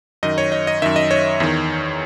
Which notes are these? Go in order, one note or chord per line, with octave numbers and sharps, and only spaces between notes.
F#2 D#3 D#5
C#5
D#5
D#5
F#2 D#3 E5
D#5
C#5
E2 D#3